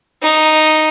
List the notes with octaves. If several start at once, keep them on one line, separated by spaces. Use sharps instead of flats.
D#4